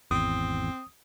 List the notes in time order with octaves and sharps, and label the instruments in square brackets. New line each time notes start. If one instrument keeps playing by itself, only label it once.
[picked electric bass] G#1 E2 [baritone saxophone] C4 [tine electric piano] D#6